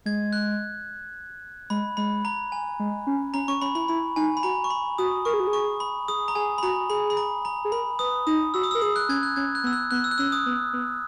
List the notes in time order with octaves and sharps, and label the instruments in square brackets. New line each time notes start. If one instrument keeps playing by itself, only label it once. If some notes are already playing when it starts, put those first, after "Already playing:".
[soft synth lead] G#3 [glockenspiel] G#6
[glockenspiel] F#6
[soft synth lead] G#3 [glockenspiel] B5
[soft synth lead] G#3 [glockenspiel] B5
[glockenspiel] A#5
G#5
[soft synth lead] G#3
C#4
[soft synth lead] C#4 [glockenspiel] A#5
[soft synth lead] C#4 [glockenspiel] C#6
[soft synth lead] C#4 [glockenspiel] B5
[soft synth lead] E4 [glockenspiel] B5
[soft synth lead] E4 [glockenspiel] B5
[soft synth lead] D#4 [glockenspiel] G#5
[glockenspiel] B5
[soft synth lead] F#4 [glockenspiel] A#5
[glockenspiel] C#6
B5
[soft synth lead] F#4 [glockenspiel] D#6
[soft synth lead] A#4 [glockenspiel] C#6
[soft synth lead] G#4
F#4
G#4
[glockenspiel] C#6
B5
[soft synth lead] G#4 [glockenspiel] D#6
[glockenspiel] A#5
[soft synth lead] G#4 [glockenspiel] G#5
[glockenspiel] B5
[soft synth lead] F#4 [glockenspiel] A#5
[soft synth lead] G#4 [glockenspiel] B5
[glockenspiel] B5
A#5
A#5
[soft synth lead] G#4
[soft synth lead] A#4 [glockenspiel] B5
[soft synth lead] B4 [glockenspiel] D#6
[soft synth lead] D#4 [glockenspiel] D#6
[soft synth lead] F#4 [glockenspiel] E6
[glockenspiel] D#6
E6
[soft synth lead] A#4
[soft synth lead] G#4 [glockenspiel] D#6
[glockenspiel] F#6
[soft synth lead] C#4 [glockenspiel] G#6
[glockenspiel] F#6
[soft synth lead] C#4 [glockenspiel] G#6
[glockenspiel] F#6
[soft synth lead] B3 [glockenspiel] E6
[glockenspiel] F#6
[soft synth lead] B3 [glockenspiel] F#6
[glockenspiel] E6
F#6
[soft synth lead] C#4 [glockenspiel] E6
[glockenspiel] D#6
[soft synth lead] B3
B3